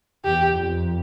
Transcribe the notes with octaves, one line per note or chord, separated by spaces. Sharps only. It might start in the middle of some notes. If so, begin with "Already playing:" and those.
E2 G4
F2